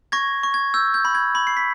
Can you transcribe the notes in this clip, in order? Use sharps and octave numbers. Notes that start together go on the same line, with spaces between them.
C#6 G#6 A#6
C#6
G#6
E6 G6
G6
B5
G#6
B5
C7
B6